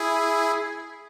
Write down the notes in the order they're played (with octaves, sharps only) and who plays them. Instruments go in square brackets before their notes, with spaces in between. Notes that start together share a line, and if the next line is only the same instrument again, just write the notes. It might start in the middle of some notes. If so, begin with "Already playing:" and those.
Already playing: [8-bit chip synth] E4 G#4